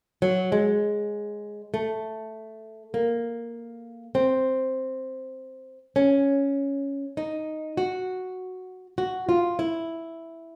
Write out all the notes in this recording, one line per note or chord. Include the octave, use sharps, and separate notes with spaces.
F#3
G#3
A3
A#3
C4
C#4
D#4
F#4
F#4
F4
E4